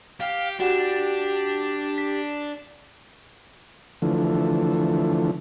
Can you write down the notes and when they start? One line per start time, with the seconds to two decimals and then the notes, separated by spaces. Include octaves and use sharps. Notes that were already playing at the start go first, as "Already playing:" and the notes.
0.20 G4 F5
0.60 D4 F#4 G4 F#5
1.98 B6
4.02 D3 E3 F3 A3